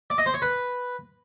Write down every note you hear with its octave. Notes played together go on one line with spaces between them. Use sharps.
D5
D#5
C5
C#5
B4